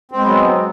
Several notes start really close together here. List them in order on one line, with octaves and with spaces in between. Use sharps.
C4 G#3 B3 F#3